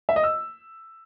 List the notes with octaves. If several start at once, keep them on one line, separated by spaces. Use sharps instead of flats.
E5
D#5
E6